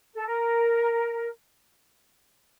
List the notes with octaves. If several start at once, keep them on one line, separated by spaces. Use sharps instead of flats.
A4
A#4